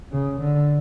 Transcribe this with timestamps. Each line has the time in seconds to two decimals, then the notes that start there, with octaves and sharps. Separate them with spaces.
0.12 C#3
0.40 D3